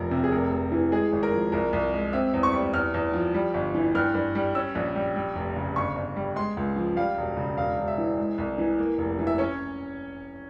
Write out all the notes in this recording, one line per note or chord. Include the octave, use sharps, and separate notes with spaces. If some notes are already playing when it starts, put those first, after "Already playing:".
Already playing: F1 F3 A#4
C3
G#4
F1 A#4
F1
E3
G#3 G#4
G#1
A#4
F3
C2 A#4
C2
G#3
C4 E5
E2
C#6
G3
E2 F6
E2
F3
G3
G1
E3
G2 F6
G2
G3
C#4 E6
A#1
G3
G3
F1
C#3
G1 C#6
G1
G3
G#3 C6
C#2
F3
G3 F5
E1
C#3
E1 F5
E1
E5
E3
G#3
C2
E3
A#3
F1
E3
E5
C#4 C#5